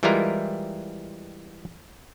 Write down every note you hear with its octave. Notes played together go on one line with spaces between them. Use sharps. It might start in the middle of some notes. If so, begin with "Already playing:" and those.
E3 G3 G#3 E4 F4 A#4